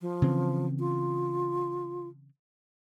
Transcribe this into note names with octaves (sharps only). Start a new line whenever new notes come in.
F3
C#3 E3 C4
F4